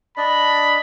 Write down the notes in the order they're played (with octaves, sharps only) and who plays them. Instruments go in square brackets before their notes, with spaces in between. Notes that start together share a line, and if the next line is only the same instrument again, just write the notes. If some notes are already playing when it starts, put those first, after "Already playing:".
[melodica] D4 D5 D#5 [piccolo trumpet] B5